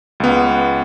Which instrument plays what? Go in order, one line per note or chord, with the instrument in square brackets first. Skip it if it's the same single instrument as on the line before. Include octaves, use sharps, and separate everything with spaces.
[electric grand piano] C#2 B3